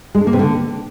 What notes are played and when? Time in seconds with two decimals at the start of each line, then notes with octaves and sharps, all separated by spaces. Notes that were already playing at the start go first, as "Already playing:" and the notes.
0.15 G#3
0.21 D4
0.27 A#3
0.33 C3
0.39 D3